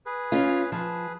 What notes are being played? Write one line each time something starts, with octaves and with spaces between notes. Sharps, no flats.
G#4 B4
C#4 F4
F3 G#4 B4